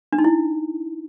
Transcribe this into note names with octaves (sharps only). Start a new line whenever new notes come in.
D4
D#4
E4